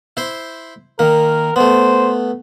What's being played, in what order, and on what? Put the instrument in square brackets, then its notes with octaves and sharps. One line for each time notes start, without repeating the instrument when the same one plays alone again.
[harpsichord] E4 C5
[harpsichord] D#3 A#3 [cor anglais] A#4
[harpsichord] A3 B3 [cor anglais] C5